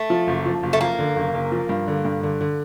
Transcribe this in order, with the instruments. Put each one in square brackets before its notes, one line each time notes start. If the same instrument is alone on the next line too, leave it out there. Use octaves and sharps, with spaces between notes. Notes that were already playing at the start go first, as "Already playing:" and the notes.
Already playing: [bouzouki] A3
[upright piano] F3
F#1
F3
F#1
[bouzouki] A3
[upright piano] F3 [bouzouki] A#3
[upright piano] D3
F#1
F#1
F3
G2
D3
G2
D3
D3